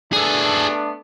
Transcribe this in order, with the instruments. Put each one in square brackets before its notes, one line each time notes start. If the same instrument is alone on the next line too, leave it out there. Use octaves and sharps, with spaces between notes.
[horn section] A3 B3 D4 [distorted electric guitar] G#4 A4